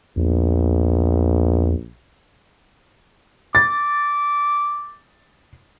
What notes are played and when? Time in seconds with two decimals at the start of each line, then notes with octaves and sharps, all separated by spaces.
0.17 A#1 E2
3.55 D6 A6